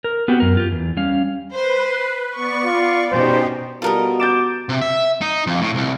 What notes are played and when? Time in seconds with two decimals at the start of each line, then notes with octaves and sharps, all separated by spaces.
0.04 A#4
0.28 B3 C4 F#4 G4 F#5 G5
0.40 F#2 A#4
0.57 F4 G4
0.72 E2
0.97 G3 C#4 F5
1.53 B4 C5
2.35 B3 D5 C#6
2.65 F4 D5
3.11 B2 C#4 D#4 G4 C5
3.82 B2 G3 F4 A4 A#4 D#5
4.20 D6 G6 A6 E7
4.69 C3
4.81 E5
5.21 D#4
5.47 F2
5.61 A2
5.75 C2